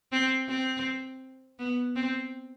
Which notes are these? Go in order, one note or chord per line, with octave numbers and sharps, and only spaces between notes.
C4
C4
B3
C4